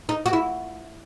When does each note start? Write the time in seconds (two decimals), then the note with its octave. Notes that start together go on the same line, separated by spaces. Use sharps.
0.09 D#4
0.26 F#4
0.33 E4